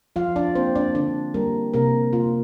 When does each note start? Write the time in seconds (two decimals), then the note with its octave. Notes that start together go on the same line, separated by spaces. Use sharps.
0.16 F3 F4 F5
0.36 D4 D5
0.55 A#3 C4 C5
0.75 D4 D5
0.95 D3 D4 D5
1.34 G3 A#3 A#4
1.74 C3 A#3 A#4
2.13 A#3 F4